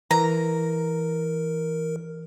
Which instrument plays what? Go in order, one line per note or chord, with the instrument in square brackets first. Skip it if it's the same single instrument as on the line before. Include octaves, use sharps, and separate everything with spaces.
[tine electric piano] E3 [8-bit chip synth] A#4 [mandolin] A#5